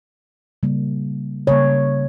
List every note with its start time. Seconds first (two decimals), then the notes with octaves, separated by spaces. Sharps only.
0.63 C#3 G3 A#3
1.47 C#3 G3 A#3 C#5